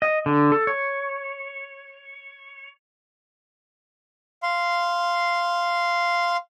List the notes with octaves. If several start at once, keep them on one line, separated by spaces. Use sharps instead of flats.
D#5
D3
A4
C#5
F5 C6